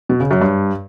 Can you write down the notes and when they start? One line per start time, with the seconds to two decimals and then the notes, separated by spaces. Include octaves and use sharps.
0.09 B2
0.20 C#3
0.31 F#2
0.41 G2